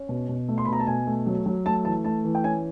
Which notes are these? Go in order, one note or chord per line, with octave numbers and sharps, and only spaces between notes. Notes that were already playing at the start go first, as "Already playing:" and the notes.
Already playing: C#4
B2
B2
A3
C6
B5
B2 A#5
A5
B2 G#5
A3
F#3
F#3
A3 A5
E3 A5
A3 A5
E3
G5
C#4 G#5